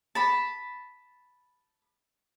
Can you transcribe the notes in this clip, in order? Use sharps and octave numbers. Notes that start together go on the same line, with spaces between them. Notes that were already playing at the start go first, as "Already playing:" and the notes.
A5 B5